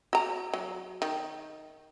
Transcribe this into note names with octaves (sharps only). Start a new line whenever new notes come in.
F#4 A#5
F#3
D#3